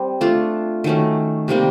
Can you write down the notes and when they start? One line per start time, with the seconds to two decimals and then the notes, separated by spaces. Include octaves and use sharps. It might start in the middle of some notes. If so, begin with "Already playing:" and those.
Already playing: G3 C4
0.21 A3 D4 F4
0.84 D#3 F#3 A3 C#4
1.48 C3 D#3 G3 A#3